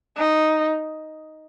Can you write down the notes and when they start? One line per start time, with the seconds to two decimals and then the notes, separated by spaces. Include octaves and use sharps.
0.17 D#4